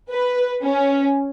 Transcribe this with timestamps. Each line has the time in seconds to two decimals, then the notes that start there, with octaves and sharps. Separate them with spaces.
0.10 B4
0.63 C#4